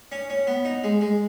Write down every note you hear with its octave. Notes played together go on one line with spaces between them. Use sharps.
C#4
C#4
B3
D#4
G#3
G#3